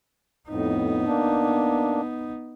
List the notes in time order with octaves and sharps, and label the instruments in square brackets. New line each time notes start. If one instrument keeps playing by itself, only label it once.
[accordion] F2 A2 [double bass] B3 D#4
[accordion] A#3 D4